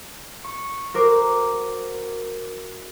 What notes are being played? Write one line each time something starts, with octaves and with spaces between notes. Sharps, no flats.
C#6
F#4 A#4 C5 D6